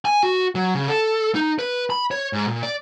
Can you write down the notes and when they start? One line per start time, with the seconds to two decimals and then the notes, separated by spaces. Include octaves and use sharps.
0.05 G#5
0.23 F#4
0.55 F#3
0.75 C#3
0.88 A4
1.35 D#4
1.59 B4
1.90 B5
2.11 C#5
2.33 G#2
2.48 A#2
2.63 D5